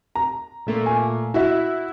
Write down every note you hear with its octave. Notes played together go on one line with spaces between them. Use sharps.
A#5
A#2 A3 A#3
G#5
E4 F#4 E5